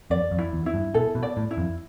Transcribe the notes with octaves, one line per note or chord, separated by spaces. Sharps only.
F2 D5
F2
E4
E2
E4
G2
B2 A4
B2
D5
A2
E4
F2